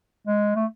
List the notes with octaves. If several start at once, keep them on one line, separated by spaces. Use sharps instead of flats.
G#3
A3